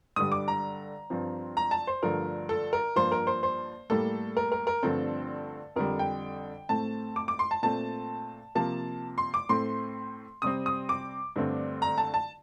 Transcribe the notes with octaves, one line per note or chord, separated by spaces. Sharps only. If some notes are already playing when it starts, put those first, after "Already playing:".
G2 D3 G3 D#6
D6
A#5
G2 F3 C4
A#5
A5
C5
G2 D3 F3 A3 A#4
A4
A#4
G2 F3 A#3 C5
A#4
C5
C5
A2 G3 A#3 A4
A#4
A#4
A#4
G2 D3 F3 A3 C4 A4
F2 D3 G3 A#4
G5
A2 A3 C4 A5
D6
D6
C6
A5
A#2 A3 C4 A5
C3 F3 A#3 A5
C6
D6
A2 A3 C4 C6
C3 G3 C4 D#6
D#6
D6
G2 D3 A3 C4
A#5
A5
A5